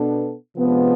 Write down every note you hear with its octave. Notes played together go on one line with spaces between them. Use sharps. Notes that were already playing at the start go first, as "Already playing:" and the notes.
Already playing: B2 B3 D4 A4
C3 F3 G#3 B3 D4